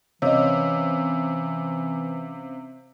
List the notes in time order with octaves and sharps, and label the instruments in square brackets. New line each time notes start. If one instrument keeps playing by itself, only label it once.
[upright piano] C3 [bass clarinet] E3 [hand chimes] C#4 F5 E6 [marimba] C#5 D#5